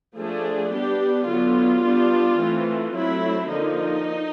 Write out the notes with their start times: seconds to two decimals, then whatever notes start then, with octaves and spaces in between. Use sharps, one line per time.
0.17 F3 A3 D4 G#4
0.72 G3 B3 D4 G4
1.28 D3 F#3 B3 F4
1.84 G3 B3 D4
2.40 E3 A3 C4
2.95 F#3 A3 C4 E4
3.51 D3 F3 A#3 D#4